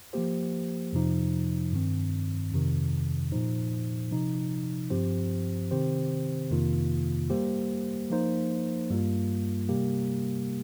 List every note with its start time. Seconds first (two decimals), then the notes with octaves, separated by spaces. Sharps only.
0.13 F3 A#3 G4 C5
0.93 F2 C3 F3 D#4
1.72 G2 D#3 C4
2.52 F2 C3 D#3
3.32 A#2 F3 D#4 C5
4.12 C3 F3 D#4
4.90 G2 F3 C4 G4 C5
5.71 C3 D#3 C4 G4 C5
6.50 F2 C3 D#3 A#3 F4
7.30 G3 A#3 G4 C5
8.10 F3 A#3 D#4 C5
8.90 G2 G3 A#3 F4
9.69 C3 G3 A#3 G4